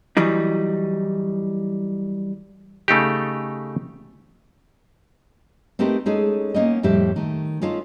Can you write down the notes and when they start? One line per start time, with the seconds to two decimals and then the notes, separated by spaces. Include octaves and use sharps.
0.17 E3 F#3 G3 D#4
2.88 C#3 A3 D#4 G4
5.79 A3 C4 D#4 G4 A#4 B4
6.06 G#3 C#4 D#4 G#4 A4
6.54 A#3 B3 C#4 D#4 A#4 D#5
6.83 F2 A2 G3 G4 E5
7.16 D#3 A3
7.61 C#4 D#4 F4 A4 B4